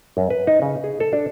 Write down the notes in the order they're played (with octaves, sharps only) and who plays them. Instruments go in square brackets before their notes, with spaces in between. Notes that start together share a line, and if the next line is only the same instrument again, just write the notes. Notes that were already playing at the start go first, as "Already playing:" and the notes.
[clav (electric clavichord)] F#2
B4
D#4
C#3
G#4
A4
D4